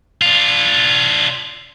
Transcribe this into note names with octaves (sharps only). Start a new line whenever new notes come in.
D4 F4